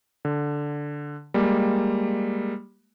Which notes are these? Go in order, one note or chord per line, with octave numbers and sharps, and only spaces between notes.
D3
G3 G#3 A#3